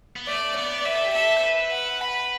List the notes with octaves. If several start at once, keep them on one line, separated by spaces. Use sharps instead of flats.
B3
A3 D5
B3 D5
B4 E5
A4
G4
A4 E5
C5
B4
F#5
B5